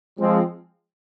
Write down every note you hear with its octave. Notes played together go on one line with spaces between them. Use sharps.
F3 G#3 C4